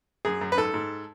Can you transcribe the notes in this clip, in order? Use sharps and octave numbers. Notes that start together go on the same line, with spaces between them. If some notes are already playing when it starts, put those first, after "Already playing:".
F#2 G#4
F#2
B4
G#2 A4
G#2